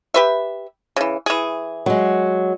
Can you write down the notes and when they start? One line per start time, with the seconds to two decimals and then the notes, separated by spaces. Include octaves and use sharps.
0.14 G4 B4 E5
0.96 C#3 E3
1.26 E3 G#4
1.86 F#3 G#3